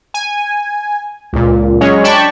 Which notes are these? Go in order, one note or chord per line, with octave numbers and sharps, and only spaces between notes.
G#5
C#2 A#2
F#3 G#3 C#4 C#5
D4 D5 G5 A5 B5 C#6